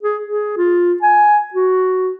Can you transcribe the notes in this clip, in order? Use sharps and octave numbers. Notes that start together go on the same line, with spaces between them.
G#4
G#4
F4
G#5
F#4